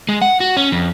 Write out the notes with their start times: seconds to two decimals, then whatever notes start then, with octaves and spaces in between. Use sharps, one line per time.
0.09 G#3
0.22 F#5
0.40 F#4
0.57 C#4
0.72 F2